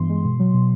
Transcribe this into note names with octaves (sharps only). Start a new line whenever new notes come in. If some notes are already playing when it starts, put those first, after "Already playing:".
Already playing: G2 E3 B3 C6
G#3
B2
F#3
B2